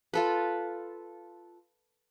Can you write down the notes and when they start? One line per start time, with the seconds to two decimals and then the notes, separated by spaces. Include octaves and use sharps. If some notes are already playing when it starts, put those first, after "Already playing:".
0.13 F4 A4 B4